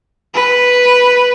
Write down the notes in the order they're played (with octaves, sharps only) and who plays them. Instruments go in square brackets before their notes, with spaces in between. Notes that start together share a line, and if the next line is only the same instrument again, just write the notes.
[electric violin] B4